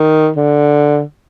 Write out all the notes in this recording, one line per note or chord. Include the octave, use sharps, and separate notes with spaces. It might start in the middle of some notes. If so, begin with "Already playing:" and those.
Already playing: D#3
D3